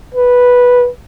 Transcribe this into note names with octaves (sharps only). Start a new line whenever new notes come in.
B4